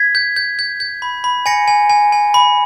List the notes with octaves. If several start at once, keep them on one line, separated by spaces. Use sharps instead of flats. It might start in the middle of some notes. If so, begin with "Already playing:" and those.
Already playing: G#6 B6
G6
G6
G6
G6
B5
B5
G#5 A#6 C#7
G#5
G#5
G#5
B5